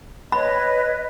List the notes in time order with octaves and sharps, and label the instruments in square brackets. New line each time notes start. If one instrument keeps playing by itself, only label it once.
[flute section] B4 C#5 D#5 [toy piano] B5